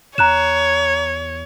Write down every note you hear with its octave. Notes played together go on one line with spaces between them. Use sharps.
E2 C#5 A#5 F#6 E7